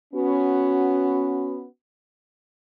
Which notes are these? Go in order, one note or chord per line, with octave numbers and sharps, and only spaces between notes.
B3 C#4 F#4